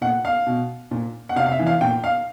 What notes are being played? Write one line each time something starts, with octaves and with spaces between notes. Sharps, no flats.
A#2 F#5
F5
B2
A#2
F#5
C3 F5
F5
E5
E3
F5
A#2 G5
F5